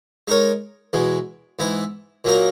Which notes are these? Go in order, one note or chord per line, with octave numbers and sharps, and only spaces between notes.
G#3 D#4 A#4 C#5
E2 B2 G#3
G#2 E3 B3 E4
A#2 F#3 A#3 D#4 A#4